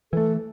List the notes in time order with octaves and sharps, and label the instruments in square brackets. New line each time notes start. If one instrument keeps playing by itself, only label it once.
[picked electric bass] E3 A3 [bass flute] A4